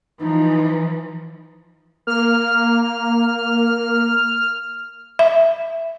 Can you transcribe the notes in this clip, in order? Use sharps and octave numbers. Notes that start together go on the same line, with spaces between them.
E3 F3 D#4
A#3 F6
E5